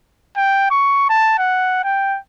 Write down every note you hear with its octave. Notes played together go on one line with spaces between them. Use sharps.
G5
C#6
A5
F#5
G5